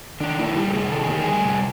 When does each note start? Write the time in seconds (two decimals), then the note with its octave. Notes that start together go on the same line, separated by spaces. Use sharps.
0.20 D#3 D4
0.39 A#3 E4
0.56 G3 G4
0.70 A4
0.73 C3 G#4
0.92 D#3 A4
1.01 G#4
1.09 A#3 G4
1.21 G#4
1.28 G3
1.44 C3